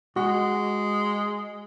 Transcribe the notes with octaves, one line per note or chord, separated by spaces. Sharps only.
G#3 F#4